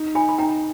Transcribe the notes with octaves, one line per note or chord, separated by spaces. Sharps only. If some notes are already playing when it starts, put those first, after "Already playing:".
Already playing: D#4
D#4 G#5 B5
B5
D#4 G5 A#5